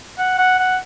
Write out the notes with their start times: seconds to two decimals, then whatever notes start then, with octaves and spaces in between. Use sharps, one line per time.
0.18 F#5
0.38 F#5
0.59 F#5